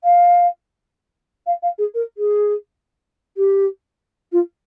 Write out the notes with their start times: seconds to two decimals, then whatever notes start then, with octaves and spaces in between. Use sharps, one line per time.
0.03 F5
1.46 F5
1.62 F5
1.78 G#4
1.94 A#4
2.17 G#4
3.36 G4
4.32 F4